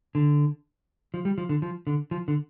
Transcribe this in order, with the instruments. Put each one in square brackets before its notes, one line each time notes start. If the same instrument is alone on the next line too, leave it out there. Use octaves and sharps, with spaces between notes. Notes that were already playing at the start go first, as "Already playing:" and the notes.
[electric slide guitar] D3
F3
G3
F3
D3
F3
D3
F3
D3